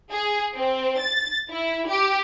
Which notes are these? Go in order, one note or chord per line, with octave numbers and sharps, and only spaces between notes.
G#4
C4
A6
E4
G4